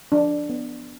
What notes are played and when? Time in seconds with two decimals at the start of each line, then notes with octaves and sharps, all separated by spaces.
0.12 F3 D4
0.49 B3